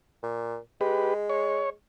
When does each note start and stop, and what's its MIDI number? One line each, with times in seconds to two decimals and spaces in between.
0.23 0.58 46
0.81 1.72 56
0.81 1.14 67
0.81 1.14 71
1.30 1.70 73